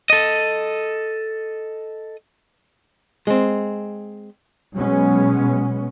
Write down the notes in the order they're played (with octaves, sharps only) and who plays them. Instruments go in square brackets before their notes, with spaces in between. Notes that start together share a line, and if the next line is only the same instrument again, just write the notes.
[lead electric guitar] A4 D#5
[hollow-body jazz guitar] G#3 C4
[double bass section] B2 F#3 G#3 B3 C#4